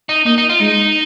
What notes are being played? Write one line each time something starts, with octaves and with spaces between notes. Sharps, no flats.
D#4
A#3 D#4
D#4
F4
G#3 D#4